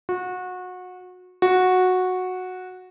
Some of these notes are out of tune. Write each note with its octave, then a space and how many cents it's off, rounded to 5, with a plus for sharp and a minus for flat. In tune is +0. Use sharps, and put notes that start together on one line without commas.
F#4 -25
F#4 -10